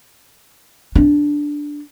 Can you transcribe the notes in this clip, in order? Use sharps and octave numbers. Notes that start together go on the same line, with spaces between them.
D4